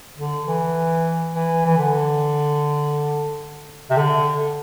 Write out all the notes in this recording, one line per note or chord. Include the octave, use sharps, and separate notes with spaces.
D3
E3
E3
E3
D3
C3
D3